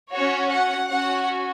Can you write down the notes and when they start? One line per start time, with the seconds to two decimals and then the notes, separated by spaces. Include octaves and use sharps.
0.11 C#4 F#4 C#5
0.50 F#5
0.90 C#4 F#4 F#5